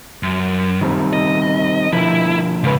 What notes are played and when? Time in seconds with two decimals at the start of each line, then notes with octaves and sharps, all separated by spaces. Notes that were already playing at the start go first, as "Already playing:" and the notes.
0.23 F#2
0.81 D#3 G3 C4
1.13 D#5
1.93 B2 D3 F3 E4
2.64 C#2 G#2 C#3 B4